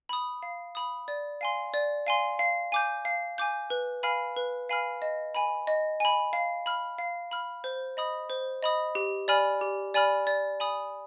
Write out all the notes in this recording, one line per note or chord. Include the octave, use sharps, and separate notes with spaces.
B5 D#6
F5
B5 D#6
D5
F5 G#5 C6
D5
F5 G#5 C6
F5
G#5 D6 G6
F5
G#5 D6 G6
B4
F5 G#5 B5 F6
B4
F5 G#5 B5 F6
D#5
G#5 B5
D#5
G#5 B5
F5
B5 F6
F5
B5 F6
C5
D#5 B5 D#6
C5
D#5 B5 D#6
G4
D5 G#5 B5 F6
G4
D5 G#5 B5 F6
D5
G#5 B5 D#6